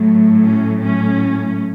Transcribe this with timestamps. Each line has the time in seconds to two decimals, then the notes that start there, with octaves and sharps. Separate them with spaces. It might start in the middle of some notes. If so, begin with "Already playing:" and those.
Already playing: A2 F#3 A3
0.46 C#4
0.82 C#4